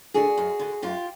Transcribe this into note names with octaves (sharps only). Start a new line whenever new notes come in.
D3 F#4 G#4
F#2
D3
F#2 F4 G4